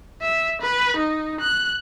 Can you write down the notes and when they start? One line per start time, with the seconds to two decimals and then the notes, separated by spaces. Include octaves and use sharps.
0.22 E5
0.61 B4
0.96 D#4
1.40 F#6